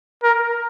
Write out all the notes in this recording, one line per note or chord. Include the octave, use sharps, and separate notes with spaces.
A#4